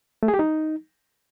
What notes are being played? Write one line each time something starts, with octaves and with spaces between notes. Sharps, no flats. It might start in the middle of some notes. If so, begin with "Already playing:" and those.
A3
G#4
G4
D#4